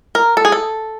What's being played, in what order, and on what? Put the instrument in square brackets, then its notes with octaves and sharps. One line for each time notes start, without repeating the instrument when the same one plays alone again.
[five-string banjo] A#4
A4
G#4
A4